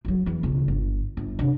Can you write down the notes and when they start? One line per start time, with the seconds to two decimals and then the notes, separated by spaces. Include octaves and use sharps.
0.05 F3 F#3
0.26 E2 E3
0.43 E1 C#2
0.68 G1
1.17 G1
1.39 C3 D4